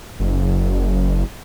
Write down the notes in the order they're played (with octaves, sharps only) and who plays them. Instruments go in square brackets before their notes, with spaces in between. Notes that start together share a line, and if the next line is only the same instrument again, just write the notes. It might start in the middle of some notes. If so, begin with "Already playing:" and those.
[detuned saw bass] F#1